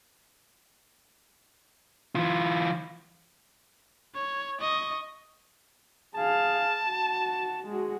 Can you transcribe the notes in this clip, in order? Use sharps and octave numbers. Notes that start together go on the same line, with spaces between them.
E3 F4
C#5
D#5 C#6
G#4 F5 A5
F#4
G#3 F#4